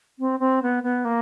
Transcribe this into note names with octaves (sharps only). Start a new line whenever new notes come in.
C4
C4
B3
B3
A#3